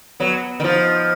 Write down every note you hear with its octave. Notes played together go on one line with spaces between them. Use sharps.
F#3 B3
D#3
F3 D#4